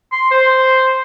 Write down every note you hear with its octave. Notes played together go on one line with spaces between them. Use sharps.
C6
C5